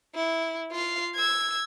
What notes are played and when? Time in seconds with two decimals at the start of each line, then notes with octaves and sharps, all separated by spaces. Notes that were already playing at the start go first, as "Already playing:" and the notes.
0.15 E4
0.72 F4 F5
1.15 E6 G#6